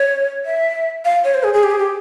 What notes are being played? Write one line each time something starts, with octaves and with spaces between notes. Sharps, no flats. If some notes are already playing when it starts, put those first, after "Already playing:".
Already playing: C#5
E5
F5
C#5
C5
G#4
G#4
G4
G#4
G4